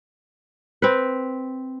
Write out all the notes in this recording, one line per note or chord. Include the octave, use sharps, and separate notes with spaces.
C4 B4